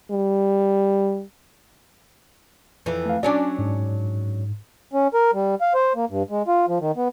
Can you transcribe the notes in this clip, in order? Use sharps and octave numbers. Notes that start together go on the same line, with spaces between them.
G3
F2 E3
A3 F5
F#3 C#4 D4 D5
G#2
C#4
A#4
G3
F5
C5
A#3
G2
G#3
F4
F3
D#3
B3